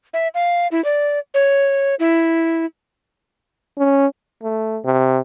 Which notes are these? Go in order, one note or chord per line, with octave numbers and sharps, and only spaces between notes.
E5
F5
E4
D5
C#5
E4
C#4
A3
C3